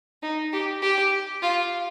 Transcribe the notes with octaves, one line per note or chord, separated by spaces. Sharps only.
D#4
G4
G4
F4